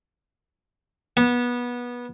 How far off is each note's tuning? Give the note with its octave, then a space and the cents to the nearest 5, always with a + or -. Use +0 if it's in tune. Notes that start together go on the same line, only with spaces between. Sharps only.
B3 -20